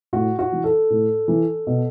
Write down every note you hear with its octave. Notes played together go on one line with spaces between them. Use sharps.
A2 F#4
F#4
E3
A4
A2
E3
B2